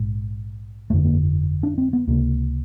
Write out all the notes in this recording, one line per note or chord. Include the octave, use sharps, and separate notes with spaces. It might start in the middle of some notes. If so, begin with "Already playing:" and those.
Already playing: A#1 G#2
G1 F2 D3 A3
A#3
D4
C4
B3
C#2 C3 A#3